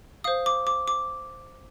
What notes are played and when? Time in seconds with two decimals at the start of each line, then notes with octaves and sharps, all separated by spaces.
0.24 C5 F5 D#6
0.46 D6
0.67 D6
0.88 D6